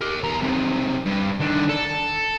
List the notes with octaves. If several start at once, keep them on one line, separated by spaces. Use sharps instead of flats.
G4 A#4
E2 A#5
C3 D#3
G2
D#3 D4
A4